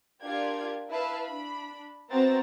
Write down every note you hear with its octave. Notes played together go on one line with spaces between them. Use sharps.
D4 F4 G4 A#4 D5 G#6
E4 B4 E5 F5 A5
D4 B5
B3 C4 F#4 E5 A#5 A6